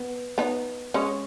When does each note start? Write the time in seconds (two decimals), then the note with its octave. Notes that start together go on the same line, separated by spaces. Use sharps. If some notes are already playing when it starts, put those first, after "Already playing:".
Already playing: B3
0.38 B3 D#4
0.94 G#3 C#4